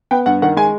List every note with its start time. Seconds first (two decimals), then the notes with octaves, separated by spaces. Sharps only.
0.11 B3 G5
0.26 G2 F#5
0.42 D#3 F#5
0.57 G#3 G#5